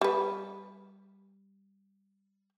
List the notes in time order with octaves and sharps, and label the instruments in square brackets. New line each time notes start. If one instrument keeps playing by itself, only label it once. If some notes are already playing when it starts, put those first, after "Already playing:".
[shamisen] G3 B4